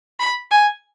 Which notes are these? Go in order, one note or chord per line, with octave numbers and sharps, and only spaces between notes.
B5
G#5